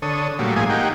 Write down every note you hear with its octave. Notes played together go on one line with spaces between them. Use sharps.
D3 A4 C#5 D#6
A#2 F#3 G3 A3
A2 F3 A#3 G#4 G#5 D#6
A#3 D#4 G4 F#5 G5